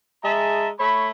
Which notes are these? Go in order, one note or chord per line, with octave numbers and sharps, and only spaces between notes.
G#3 G#4 E5 A5 A#5
A3 C#5 B5